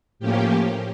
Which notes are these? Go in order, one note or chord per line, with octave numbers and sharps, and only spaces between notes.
A2 F3 A#3 C#4 G4